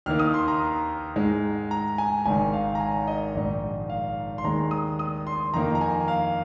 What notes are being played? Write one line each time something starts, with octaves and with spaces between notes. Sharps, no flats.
D#2 D#3 A#3 D#4 F6
D#6
C6
A#5
G#2 G#3 D#4
A#5
G#5
G#1 G#2 D#3 G#5
F5
A#5
G#5
D#5
A#1 G#2 D#3
F5
C6
D#2 D#3 G#3 A#5
D#6
D#6
C6
F2 D#3 A#3 D#4 A#5
A#5
G#5
F5